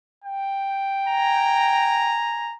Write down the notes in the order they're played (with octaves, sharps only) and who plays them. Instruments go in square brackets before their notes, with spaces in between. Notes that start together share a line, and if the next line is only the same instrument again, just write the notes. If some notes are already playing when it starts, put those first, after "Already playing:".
[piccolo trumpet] G5
[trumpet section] G#5 A#5